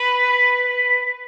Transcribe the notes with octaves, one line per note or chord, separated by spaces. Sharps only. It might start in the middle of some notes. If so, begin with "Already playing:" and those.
Already playing: B4